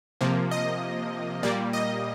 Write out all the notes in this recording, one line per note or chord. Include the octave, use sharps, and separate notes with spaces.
C3 F3 A#3
D#5
A#2 G3 A#3 D5
D#5